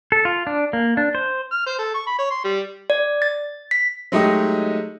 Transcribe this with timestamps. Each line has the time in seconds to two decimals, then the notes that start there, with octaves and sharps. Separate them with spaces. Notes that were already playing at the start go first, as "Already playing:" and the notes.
0.12 A4
0.25 F4
0.47 D4
0.73 A#3
0.97 D4
1.15 C5
1.52 F6
1.67 C5
1.79 A4
1.94 C#6
2.07 B5
2.19 C#5
2.31 C6
2.44 G3
2.90 D5
3.22 A6
3.71 B6
4.12 F#3 G#3 A3 D#4 G4 D#5